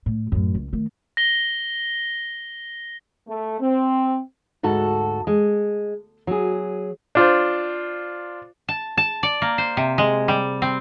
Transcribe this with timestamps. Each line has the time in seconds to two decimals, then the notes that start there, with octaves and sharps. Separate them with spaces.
0.06 A2
0.32 F#2 A2
0.55 C#2
0.73 D#3 A3
1.17 A#6 G7
3.28 A3
3.60 C4
4.63 D2 G#2 F#4 A4 A5
5.27 G#3
6.27 F#3 G#4
7.15 D4 F4 C5
8.68 A5
8.97 A5
9.23 D5
9.42 A#3
9.58 C5
9.77 C3
9.98 G#3
10.28 G3
10.62 C4